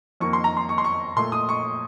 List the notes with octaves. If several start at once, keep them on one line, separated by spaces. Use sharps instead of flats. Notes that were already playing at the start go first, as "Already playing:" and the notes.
F2 D#3 A#3 C#6
C6
A#5
C6
C#6
C6
C#6
A#2 A3 C6
D#6
C#6